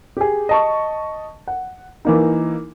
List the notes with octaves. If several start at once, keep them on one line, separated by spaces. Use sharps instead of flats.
G4 G#4
D#5 A5 C#6
F#5
E3 A#3 D#4